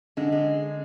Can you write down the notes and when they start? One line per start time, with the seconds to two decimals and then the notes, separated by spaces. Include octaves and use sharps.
0.17 D3 G#3
0.32 G#3